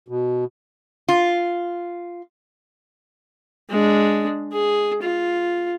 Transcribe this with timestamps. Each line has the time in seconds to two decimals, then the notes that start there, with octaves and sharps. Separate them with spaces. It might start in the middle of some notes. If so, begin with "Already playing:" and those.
0.08 B2
1.08 F4
3.70 G#3 D4
4.52 G#4
5.02 F4